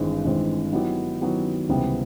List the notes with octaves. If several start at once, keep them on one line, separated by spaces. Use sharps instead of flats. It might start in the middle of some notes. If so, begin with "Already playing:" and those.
Already playing: G#1 G2 E3 G#3 C4
G#1 G2 E3 G#3 C4
D#3 F#3 B3 E4 G4
D#3 F#3 B3 E4 G4
C#2 C3 E3 G3 B3